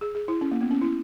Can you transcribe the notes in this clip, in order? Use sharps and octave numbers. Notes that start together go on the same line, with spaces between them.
G#4
G#4
E4
C#4
A#3
B3
C#4
E4